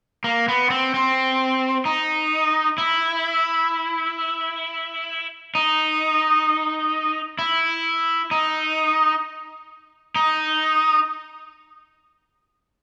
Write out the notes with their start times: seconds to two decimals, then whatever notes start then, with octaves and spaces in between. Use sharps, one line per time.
0.24 A#3
0.48 B3
0.70 C4
0.94 C4
1.85 D#4
2.78 E4
5.55 D#4
7.39 E4
8.31 D#4
10.16 D#4